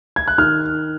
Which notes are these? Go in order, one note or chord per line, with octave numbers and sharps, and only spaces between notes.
G#6
F#6
D#3 F6